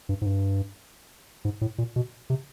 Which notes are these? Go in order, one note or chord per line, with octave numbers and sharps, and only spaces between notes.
G2
G#2
G2
G#2
A2
A#2
B2
C3